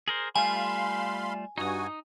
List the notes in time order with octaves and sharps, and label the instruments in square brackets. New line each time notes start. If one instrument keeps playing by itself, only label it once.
[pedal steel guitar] G#4 A#4 C5
[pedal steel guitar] G3 A3 F4 [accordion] F5 B5 C6 [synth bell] G#5
[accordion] G2 F#4 G#5 [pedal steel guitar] D#4 D#6